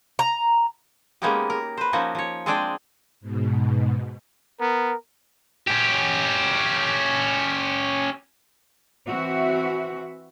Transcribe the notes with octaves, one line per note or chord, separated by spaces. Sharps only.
A#5
G#3 A#3 B3 C#4 D#4 G4
A#4
B4 C5
F3 A#3 C#4 D#4 F#4
F3 C#5
G#3 C4 D4 G#4 D5 G5
G#2 B2
B3 A#4
C#4 G4
E3 C4 F#4 E5